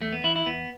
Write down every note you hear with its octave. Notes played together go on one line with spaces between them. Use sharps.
E2 A3
B3
E3 E4
E4
E2 B3